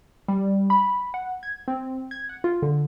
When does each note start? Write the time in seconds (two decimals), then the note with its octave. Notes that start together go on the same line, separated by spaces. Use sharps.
0.28 G3
0.70 B5
1.14 F#5
1.43 G#6
1.68 C4
2.11 G#6
2.29 F#5
2.44 F4
2.62 D3